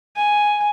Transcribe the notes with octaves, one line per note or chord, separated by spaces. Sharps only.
G#5